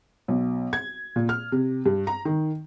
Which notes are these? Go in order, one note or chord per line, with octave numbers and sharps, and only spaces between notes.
B1
G#6
A#2
F6
C3
G2
A#5
D#3